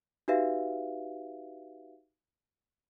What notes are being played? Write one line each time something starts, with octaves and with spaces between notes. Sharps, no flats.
D#4 F#4 G4 B4 E5 F5